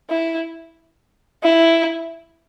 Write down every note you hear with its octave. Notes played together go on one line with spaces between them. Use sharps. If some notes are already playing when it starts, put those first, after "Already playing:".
E4
E4